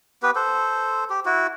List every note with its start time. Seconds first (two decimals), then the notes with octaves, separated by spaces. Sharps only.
0.23 B3 G4 B4
0.36 A4 C5
1.10 G4
1.26 E4 F#4